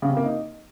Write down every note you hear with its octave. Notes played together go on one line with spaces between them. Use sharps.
C#3
C3
A#3
D#4